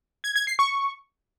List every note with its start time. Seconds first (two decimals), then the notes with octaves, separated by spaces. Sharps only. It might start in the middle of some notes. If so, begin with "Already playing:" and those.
0.24 G#6
0.36 G#6
0.47 C7
0.59 C#6